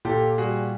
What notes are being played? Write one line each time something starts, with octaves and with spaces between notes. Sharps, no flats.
A#2 G4 A4
G3 F#4 G#4